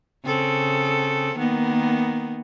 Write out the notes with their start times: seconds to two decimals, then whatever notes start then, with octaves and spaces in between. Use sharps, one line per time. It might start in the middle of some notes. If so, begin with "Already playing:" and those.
0.25 C#3 C4 A4
1.37 D#3 A#3 B3